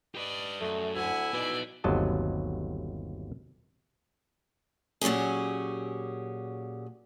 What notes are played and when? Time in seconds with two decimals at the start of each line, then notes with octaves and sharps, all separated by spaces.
0.15 G4 B4 D5 D#5
0.61 F#2 A3
0.95 D2 E4 F#5 G#5
1.34 B2 B3 D#4 D5
1.84 G1 D#2 C3 F#3 D#5 A5
5.01 A#2 F#3 C#4 G4 G#4